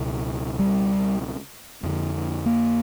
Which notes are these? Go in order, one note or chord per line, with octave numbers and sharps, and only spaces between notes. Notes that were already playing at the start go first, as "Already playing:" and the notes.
Already playing: C#2 B2
G3
F2 D3
A#3